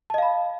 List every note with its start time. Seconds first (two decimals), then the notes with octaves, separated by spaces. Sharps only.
0.10 A5
0.14 D#5
0.18 F5
0.22 B5